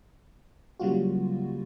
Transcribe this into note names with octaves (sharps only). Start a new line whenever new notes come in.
C#3 F#3 G3 A#3 F4 F#4